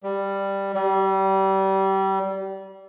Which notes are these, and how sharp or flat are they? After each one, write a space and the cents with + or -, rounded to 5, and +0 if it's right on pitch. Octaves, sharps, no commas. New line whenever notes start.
G3 +5
G3 -25